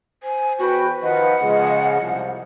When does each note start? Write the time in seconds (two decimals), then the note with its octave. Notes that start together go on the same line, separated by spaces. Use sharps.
0.23 C5 G#5
0.59 E2 F#4 B4 G5
1.03 D#3 F3 B4 D#5 F#5
1.43 C#3 F3 G#3
2.01 C2 F3